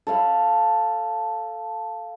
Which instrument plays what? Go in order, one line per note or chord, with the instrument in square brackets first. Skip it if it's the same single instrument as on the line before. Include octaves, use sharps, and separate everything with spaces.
[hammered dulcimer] A4 C#5 F5 B5